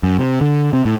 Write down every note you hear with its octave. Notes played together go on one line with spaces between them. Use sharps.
F#2
C3
D3
C3
A2